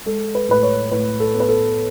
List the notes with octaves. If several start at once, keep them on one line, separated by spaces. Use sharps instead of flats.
G#3 A4
B4
A2 B4
C#5
A2 B4
A4
B3
B4
A4